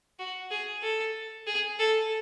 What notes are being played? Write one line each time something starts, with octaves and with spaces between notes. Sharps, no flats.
F#4
G#4
A4
G#4
A4